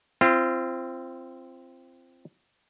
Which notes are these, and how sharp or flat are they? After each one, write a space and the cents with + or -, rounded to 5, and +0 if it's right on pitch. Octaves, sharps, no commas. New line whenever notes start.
C4 +0 F4 -30